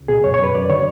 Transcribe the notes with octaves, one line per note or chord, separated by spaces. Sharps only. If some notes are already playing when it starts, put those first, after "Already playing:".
Already playing: C#2
B2 G#4
F#2 C#5
C#5
F#2 B4
F#2 D5
D3 C#5